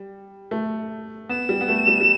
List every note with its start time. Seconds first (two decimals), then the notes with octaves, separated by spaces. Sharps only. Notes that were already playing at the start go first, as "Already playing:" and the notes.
Already playing: G3
0.51 A3
1.29 B3 E7
1.49 G3
1.61 B3
1.68 A3
1.87 G3
2.00 G3